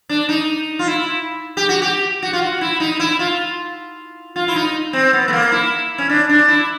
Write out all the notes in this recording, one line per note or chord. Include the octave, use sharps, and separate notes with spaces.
D4
D#4
F4
E4
G4
F#4
G4
F#4
F4
F#4
E4
D#4
E4
F4
F4
E4
D#4
C4
B3
A3
A#3
E4
C#4
D4
D4
E4